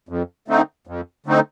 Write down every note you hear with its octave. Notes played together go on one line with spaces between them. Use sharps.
F2
D3 A3 C4 D#4
F2
D3 A3 C4 D#4